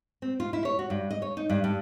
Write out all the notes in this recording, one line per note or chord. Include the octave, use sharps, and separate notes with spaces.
C4
F4
E4
C#5
F#4
G2
D#5
C#5
D#4
G2
G2